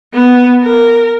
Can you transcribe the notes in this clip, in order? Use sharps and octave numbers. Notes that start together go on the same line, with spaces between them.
B3
A#4